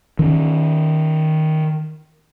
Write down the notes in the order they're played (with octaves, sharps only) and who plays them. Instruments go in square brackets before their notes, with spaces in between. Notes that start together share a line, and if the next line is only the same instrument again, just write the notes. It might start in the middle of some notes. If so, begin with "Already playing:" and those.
[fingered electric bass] D#3 C#4